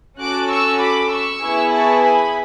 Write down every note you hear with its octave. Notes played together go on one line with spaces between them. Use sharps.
C#4 F#4 A4 D6 F#6
C#6 E6
B5 D6
C#6 E6
B3 E4 G#4
A5 C#6
G#5 B5